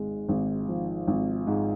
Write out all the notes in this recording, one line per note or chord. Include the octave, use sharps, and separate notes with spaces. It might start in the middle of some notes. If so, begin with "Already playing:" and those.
Already playing: G#1 G#3
G#1
F3
G#1
G#2